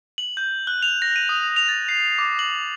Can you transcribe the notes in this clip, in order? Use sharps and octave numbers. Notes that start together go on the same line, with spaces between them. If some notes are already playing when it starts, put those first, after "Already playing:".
F#7
G6
F#6
F7
A#6
D#7
D#6
F7
A6
C7
D6
F#7